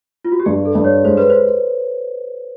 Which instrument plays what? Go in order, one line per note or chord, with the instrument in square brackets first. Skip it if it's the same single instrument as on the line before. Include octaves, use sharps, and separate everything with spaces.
[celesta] F4
F#4
G4
[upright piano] G2 [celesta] G#4
[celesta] A4
[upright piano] G2
[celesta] C#5
[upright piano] G#3 [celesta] C5
[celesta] B4
C5